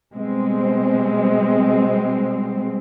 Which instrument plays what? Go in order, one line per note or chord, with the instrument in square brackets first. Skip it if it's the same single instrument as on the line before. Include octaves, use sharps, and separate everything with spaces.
[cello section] B2 G3 G#3 C4